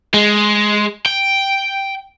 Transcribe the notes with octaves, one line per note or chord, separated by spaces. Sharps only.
G#3
G5